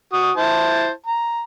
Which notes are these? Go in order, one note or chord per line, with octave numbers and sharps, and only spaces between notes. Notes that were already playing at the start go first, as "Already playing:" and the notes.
F#4 D#6
E4 C5 A5
A#5